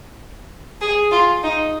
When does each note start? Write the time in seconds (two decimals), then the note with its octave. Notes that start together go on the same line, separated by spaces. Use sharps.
0.81 G#4
1.12 F4
1.44 D#4